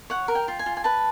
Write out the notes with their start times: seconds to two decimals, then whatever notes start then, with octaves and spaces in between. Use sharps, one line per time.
0.10 C#5 F#5
0.28 A#4
0.35 G5
0.48 F4
0.59 G#5
0.66 F4
0.77 G#5
0.84 B4 A5